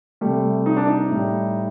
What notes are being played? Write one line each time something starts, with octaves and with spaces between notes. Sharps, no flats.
C3 G3 A3
D#4
D4
D#4
A2 G3